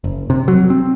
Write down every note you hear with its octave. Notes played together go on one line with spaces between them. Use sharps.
F#1
C3
F#3
C4